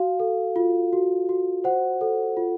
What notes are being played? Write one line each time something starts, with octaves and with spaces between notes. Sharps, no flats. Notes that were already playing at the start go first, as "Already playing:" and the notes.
Already playing: F#4 F5
A4
F4
F#4
F#4
C5 F#5
A4
F4